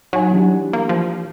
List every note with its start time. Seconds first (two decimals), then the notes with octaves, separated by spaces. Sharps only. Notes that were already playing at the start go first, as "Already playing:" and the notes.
0.13 F#3 D#4 F#5 G#5
0.30 E3 G3 D4
0.73 A#3
0.89 F3